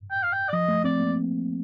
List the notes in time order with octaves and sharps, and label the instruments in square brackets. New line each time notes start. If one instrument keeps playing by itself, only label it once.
[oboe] G5
F5
G5
D5
[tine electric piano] F3 [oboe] D#5
[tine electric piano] A3
[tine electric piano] C4 [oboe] D5
[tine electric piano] A#3